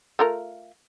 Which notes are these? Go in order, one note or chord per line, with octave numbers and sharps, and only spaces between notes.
A3 F4 A#4